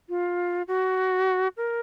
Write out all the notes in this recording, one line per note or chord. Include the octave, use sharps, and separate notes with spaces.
F4
F#4
A#4